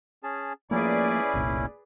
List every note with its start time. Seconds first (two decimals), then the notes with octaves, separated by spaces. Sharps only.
0.23 C#4 G#4 A5
0.71 F3 A3 A#3 C#4 E4 G#4 B4 D5
1.34 F1 C2 A#2